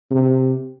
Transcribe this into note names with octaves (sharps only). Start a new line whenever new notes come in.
C3